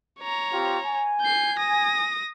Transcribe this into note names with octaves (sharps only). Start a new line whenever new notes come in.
C#5 A#5
C4 F4 G4
G#5
G6 C7
D#6 A#6